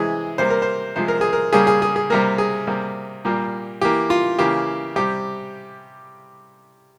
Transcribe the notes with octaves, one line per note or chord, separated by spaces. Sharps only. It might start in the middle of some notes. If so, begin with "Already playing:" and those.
Already playing: C3 E3 G#3 G#4
C3 G3 A#3 C5
A#4
C5
C3 F3 G#3 C5
A#4
G#4
A#4
C#3 G3 A#3 G#4
G#4
G#4
G#4
C3 G3 A#3 A#4
G#4
C3 G3 A#3
A#2 G3 A#3
E3 A#3 G4
F4
C#3 E3 A#3 G4
C3 G3 G4